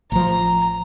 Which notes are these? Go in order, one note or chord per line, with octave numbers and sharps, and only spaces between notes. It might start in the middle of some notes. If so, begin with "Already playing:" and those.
A1 F3 A#5